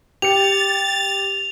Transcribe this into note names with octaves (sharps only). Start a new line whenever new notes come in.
G4 A6 C#7 F7